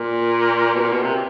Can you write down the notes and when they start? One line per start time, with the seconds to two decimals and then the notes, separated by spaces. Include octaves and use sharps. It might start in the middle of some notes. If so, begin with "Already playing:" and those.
Already playing: A#2
0.75 B2
0.81 A#2
0.92 B2
1.03 C3